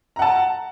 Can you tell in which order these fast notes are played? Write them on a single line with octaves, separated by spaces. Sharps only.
A#5 F#5 A5